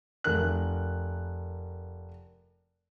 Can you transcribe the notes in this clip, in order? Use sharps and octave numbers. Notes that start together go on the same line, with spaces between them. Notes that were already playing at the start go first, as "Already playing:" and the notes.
F1 A#4 F#6